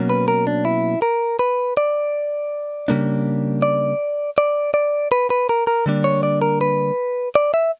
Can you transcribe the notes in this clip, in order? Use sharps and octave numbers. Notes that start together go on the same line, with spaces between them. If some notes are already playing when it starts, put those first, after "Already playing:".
Already playing: B2 F#3 A#3 C#4
B4
A#4
D4
E4
A#4
B4
D5
C#3 G3 A#3 D4
D5
D5
D5
B4
B4
A#4
A#4
D3 G3 A#3 D4
C#5
D5
A#4
B4
D5
E5